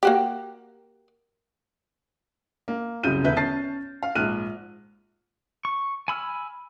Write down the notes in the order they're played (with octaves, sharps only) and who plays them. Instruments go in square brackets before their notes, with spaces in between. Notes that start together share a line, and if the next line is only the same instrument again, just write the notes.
[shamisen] A#3 F#4 G4
[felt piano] A#3
C2 F#2 C#3 F#3 G6 D#7
E1 D3 B4 E5 G6
C#4 A5 A6 C7
F5
A#1 G#2 F6 F#6 D#7
[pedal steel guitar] C#6
G#5 B5 E6 F6